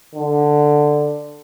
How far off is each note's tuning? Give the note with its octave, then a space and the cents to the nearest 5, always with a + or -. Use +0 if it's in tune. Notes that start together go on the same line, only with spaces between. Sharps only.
D3 +10